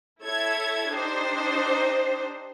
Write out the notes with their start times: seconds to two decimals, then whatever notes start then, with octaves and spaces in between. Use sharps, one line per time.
0.24 E4 A4 C#5 G#6
0.94 D4 D#4 G4 C5